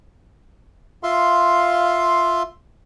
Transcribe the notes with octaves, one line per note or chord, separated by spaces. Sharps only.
F4 E5 F5 C6